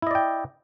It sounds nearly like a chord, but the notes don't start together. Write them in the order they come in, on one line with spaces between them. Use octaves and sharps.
E4 D#5 D5 G5